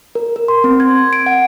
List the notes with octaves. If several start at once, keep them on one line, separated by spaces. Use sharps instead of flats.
A#4
A#4
C6
C4
G#6
D7
F#5